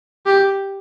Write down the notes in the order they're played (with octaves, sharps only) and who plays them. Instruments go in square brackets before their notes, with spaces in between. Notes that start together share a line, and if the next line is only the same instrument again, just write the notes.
[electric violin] G4